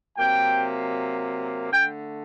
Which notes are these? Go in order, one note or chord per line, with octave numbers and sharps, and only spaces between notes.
C3 F#3 A#3 G5
D3 A3 G5